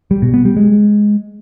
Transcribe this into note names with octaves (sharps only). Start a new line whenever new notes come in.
G3
B2
B3
G3
G#3